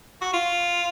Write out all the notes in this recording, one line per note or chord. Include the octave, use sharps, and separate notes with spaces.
F#4
F4